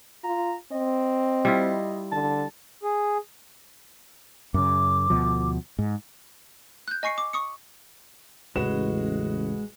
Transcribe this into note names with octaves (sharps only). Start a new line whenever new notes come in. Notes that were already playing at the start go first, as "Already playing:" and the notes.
F4 A#5
C4 D#5
G3 E4 F4
D3 A5
G#4
F#2 C#3 D6
D2 B2 F3
G#2
F#6 G6
D#5 G#5 C#6 C7 C#7
D6
C#6 D#6 C#7
A1 E2 C#3 G#3 F#4 B4 E7